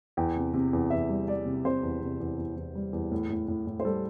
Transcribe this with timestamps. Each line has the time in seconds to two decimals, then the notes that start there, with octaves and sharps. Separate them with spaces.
0.17 E2 G5
0.36 C3
0.54 C3
0.73 E2
0.90 E2 E5
1.09 G3
1.28 G3 D5
1.46 C3
1.65 C3 C5
1.83 E2
2.02 C3
2.20 E2
2.38 E2
2.56 E2
2.75 G3
2.93 E2
3.11 A2
3.30 A2
3.48 A2
3.67 A2
3.80 C5
3.85 G3 A4